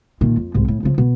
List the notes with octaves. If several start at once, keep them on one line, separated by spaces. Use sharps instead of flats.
A#2 D#3
F2
C2 G#2
A2
C#3 F3
B2